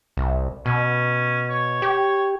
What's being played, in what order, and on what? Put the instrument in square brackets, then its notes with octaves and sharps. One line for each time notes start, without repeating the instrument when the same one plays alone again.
[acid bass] C2
[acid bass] B2 [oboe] C#4
[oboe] C#5
[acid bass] G4